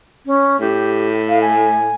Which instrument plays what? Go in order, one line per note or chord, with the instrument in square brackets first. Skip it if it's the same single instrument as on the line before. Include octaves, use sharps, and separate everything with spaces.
[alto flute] C#4
[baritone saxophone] A2 [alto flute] G4
[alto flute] F5
G#5